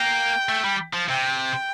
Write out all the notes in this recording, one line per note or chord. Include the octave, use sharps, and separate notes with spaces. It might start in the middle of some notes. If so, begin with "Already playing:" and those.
Already playing: A#3 G5
A3
G3
F3
C3 G5